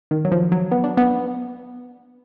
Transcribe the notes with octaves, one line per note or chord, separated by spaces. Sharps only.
D#3
F#3
F3
F#3
B3
D4
B3